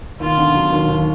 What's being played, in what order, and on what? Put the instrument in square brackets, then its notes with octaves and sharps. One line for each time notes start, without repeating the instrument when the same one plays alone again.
[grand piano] D#2 [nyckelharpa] F4
[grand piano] D3
F#3
D#2
D#2